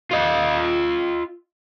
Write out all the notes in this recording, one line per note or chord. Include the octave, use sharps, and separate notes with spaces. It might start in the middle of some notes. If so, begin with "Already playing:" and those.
F4 D#5